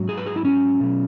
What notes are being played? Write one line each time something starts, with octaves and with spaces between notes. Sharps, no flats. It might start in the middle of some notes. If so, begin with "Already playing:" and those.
Already playing: G#2 F#3
G#4
B4
G#4
E4
C#4
B2 F#3